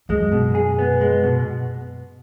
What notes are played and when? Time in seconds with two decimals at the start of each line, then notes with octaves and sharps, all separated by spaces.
0.09 F#2 G#3
0.32 B2
0.55 G#4
0.79 B3
1.01 G#3
1.24 B2